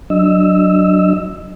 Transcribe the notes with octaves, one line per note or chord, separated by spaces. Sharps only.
F#3 D4 D#5 E6